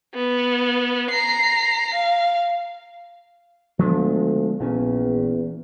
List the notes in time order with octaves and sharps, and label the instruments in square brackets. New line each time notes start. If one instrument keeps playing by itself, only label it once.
[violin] B3
A#5 C7
F5
[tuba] D2 [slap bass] F3 G#3 B3
[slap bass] A#1 A#2 C#4 [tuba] E2